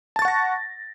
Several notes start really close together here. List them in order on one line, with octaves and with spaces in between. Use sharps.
A5 A6 C#6 F#5 A#6